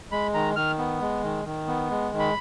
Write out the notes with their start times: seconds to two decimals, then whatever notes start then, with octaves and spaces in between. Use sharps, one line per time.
0.12 G#3 B5
0.34 D#3 A#5
0.56 D#3 F6
0.78 B3
1.01 G#3
1.23 D#3
1.45 D#3
1.67 B3
1.90 G#3
2.12 D#3
2.19 B5